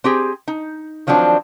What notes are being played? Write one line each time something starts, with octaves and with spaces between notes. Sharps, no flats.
C4 G4 G#4
D#4
D#3 F3 F#3 C4 D4